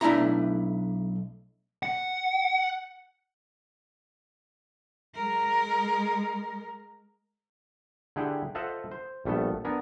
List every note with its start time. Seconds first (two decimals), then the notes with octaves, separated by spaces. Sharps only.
0.01 B1 A3 D4 E4 A#5
1.83 F#5
5.14 G#3 A#4
8.16 D3 E4 G4 G#4 F#5 G5
8.55 F4 A4 C5 D#5 E5 F#5
8.91 C5
9.25 A#1 G3 A3 B3 A4
9.65 B3 D4 A#4 G#5